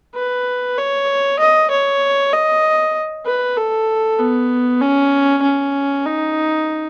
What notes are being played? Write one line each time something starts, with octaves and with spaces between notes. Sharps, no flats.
B4
C#5
D#5
C#5
D#5
B4
A4
B3
C#4
C#4
D#4